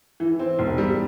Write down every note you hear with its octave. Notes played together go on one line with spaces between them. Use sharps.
E3
C4
E1
G3